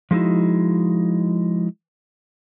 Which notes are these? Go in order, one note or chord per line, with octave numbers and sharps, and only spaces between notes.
F3 G#3 D#4 E4 F#4